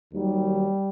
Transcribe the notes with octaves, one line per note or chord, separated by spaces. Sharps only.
D#2 D#3 F#3 G3